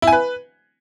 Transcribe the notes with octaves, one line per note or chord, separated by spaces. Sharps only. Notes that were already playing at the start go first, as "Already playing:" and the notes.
E4
G#5
B4